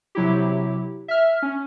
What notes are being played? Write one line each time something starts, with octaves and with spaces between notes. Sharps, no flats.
C3 F#3 E4 G4
E5 F6
C#4